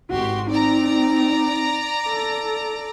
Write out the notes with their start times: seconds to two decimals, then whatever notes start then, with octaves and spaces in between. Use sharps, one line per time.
0.11 G#1 F#4 G4 C6
0.49 C4 D#4 D5 A#5
2.08 A4